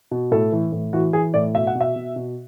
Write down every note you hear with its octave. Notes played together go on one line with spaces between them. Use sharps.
B2
A2 A4
E3
A2
E3 F#4
E3 G#4
A2 D5
B2 E5
F#5
B2
E5
B2
B2